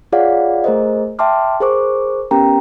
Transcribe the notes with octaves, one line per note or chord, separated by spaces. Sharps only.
F4 G#4 C#5 D5 F5 F#5
A3 G#4 A#4 C5 D#5
E5 G5 A5 C6 D6 F6
G#4 A#4 C5 C#6 D6
B3 C#4 G4 A#4 G5 A#5